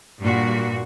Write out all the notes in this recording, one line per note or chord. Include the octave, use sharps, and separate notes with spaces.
G2 A#2 F#4